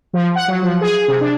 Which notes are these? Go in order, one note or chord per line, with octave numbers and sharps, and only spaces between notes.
F3
F#5
F#3
F3
G#4
C3
D4